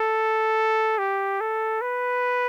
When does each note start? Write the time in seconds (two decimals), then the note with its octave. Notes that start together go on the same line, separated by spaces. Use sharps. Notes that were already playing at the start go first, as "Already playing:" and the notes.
Already playing: A4
0.99 G4
1.40 A4
1.82 B4